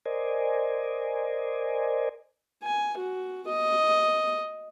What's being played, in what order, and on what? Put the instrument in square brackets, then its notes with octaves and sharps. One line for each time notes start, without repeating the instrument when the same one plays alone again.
[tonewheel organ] A#4 C5 D5 D#5 G#5
[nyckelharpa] G#5
F#4
D#5